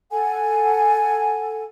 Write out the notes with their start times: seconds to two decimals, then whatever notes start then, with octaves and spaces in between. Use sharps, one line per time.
0.11 A4 F#5 G#5